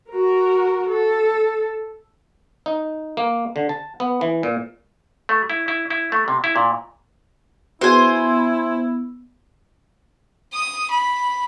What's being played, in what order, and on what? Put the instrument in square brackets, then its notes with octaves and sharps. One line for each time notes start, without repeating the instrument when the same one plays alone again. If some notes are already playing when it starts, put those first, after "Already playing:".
[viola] F#4 A#4
A4
[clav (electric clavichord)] D#4
A#3
D3
A5
B3
E3
A#2
A3
E4
E4
E4
A3
C3
E4
A#2
[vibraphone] B3 [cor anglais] E4 [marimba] F#4 G#4 B4 [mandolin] C5 G#5
[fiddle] D#6
B5